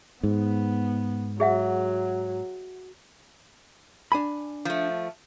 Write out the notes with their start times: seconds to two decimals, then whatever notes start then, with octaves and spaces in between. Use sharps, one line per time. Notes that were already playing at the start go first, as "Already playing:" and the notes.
0.23 G#2 B3
1.40 F#3 G#4 E5 F#5
4.12 D4 G#5 B5
4.65 F3 A3